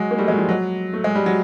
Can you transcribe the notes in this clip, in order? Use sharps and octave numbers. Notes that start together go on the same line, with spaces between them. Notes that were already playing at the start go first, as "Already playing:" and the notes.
Already playing: F#3 G#3
A#3
G3 A3
F#3 G#3
F3 G3
F#3
A3
G#3
G3
F#3